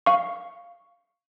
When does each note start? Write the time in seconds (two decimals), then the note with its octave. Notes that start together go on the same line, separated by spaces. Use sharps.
0.06 F5 C#6